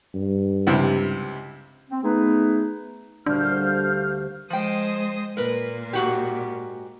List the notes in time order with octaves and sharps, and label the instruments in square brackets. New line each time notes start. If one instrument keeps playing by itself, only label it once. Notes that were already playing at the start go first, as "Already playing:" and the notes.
[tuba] G2
[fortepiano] C#2 C3 E4
[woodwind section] C4
A3 B3 D#4 G#4 B4
[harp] D2 A#2 G3 [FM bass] D4 [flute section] F5 F6 G6
[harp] G4 A4 C5
[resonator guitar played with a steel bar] F3 G5 [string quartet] G#3 C5 D#6
[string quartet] A#2 [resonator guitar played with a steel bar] A#4 B4
[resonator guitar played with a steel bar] G#2 F#4 G4